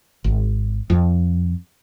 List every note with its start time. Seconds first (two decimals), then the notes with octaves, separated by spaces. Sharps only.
0.24 G#1
0.90 F2